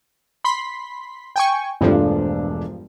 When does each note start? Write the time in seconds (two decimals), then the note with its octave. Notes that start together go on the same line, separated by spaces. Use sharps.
0.44 B5 C6 B6
1.36 G5 G#5 C#6
1.81 E1 G2 F3 A3 D4